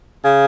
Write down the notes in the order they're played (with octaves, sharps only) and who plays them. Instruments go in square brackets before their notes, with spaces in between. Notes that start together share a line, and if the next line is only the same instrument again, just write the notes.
[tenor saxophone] C#3